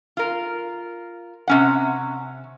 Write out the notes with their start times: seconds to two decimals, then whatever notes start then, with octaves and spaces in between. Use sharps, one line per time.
0.17 F4 A#4
1.48 C3 C#4 F#5